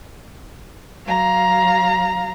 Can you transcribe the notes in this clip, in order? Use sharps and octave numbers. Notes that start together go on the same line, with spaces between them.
F#3 F5 A#5